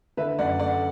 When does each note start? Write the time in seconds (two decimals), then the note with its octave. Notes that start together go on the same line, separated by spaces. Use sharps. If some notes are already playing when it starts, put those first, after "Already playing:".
0.17 D3 B4 E5
0.39 F#2 D5 F#5
0.59 A3 D5 F#5